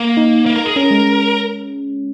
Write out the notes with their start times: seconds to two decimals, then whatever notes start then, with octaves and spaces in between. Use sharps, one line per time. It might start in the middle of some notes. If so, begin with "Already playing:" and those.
Already playing: A#3
0.17 D#4
0.46 A#3
0.56 A#4
0.66 G#4
0.76 C#4 A#4
0.91 G#3